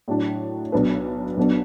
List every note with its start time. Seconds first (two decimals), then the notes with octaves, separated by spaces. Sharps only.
0.08 A2 F#3 D4
0.72 B1 B2 F#3 D4 B4
1.37 B1 B2 B3 D4